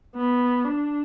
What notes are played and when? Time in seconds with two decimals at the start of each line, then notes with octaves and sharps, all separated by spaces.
0.16 B3
0.65 D4